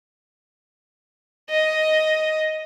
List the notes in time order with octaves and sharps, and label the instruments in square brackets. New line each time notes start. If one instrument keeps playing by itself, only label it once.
[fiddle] D#5